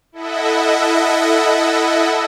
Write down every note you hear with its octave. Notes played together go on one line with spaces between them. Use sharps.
E4 A4 D#5 E5 F#5